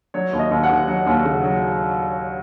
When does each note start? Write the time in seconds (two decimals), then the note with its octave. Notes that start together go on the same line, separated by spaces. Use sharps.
0.14 F#3 C#5
0.33 D#2
0.39 D#5
0.51 D#2
0.63 F#5
0.69 D#2
0.88 F#3
1.06 D#2
1.25 C#3
1.43 F#3